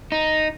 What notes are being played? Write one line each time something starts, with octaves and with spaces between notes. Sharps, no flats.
D#4